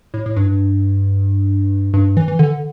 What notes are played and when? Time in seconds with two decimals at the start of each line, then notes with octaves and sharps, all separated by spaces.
0.14 A2
0.26 A2
0.36 G2
1.94 G2
2.17 E3
2.28 E3
2.39 D3